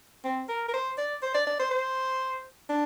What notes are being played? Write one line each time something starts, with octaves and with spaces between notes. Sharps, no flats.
C4
A#4
A#4
C5
D5
C5
D5
D5
C5
C5
D4